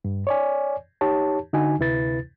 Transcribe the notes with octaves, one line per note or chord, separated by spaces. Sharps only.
G2
C#5 D5 G#5
D#4 G4 C#5 A5
D3 D#4 F#4 G#5
D2 C3 E4 B4 A6